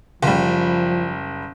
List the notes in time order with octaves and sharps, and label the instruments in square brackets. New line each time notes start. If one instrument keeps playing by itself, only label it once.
[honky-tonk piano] F#1 G3 [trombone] F3